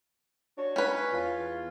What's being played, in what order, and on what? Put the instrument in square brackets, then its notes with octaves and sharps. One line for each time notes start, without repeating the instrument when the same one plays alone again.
[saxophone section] D4 F#4 C#5
[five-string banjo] C#4 B4
[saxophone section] E2 F4